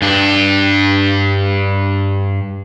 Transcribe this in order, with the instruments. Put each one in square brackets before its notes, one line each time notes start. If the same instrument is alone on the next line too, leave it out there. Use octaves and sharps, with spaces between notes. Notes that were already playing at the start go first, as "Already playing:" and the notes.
[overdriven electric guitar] G2 D4